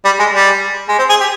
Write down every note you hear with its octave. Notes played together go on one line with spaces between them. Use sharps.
G3
G#3
G3
G#3
C4
G#4
G4